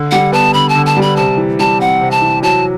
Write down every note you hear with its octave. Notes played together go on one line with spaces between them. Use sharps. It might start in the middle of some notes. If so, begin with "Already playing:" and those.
Already playing: D3
G3 F#5
B3 A5
D3 B5
A5
D3
A5
G3
B5
C3 A5
E3
G3 A5
C4 F#5
C3
A5
E3
F#3 A5